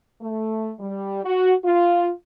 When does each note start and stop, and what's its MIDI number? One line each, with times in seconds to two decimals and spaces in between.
0.22 0.72 57
0.80 1.22 55
1.24 1.53 66
1.65 2.09 65